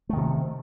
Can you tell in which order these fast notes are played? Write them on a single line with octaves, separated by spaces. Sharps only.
A3 D#3 C3